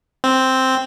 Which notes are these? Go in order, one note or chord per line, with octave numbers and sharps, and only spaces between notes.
C4